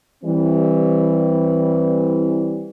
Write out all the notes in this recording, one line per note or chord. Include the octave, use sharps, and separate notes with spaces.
E3 G3 C4